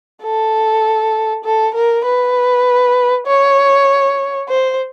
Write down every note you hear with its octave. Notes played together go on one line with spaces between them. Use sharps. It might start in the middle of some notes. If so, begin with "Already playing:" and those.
A4
A4
A#4
B4
C#5
C5